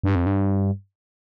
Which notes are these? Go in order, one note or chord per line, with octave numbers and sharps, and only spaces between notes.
G2
F2
G2